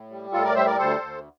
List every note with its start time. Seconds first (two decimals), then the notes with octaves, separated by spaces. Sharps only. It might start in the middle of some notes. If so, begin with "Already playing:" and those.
Already playing: A2
0.10 G3
0.32 A2 F4 A4
0.43 A#4 D5
0.55 G3 C5 E5
0.66 A#4 D5
0.78 D2 A4 C5
1.01 D2